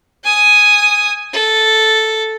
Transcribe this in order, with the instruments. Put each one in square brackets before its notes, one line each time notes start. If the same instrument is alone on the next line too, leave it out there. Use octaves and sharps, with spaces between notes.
[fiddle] G#5 D#6
A4